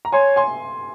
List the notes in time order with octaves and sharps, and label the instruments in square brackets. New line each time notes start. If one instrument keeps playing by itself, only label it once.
[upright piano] A#5
[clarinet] C#5 [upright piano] G#5 C6
[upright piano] G#5 C6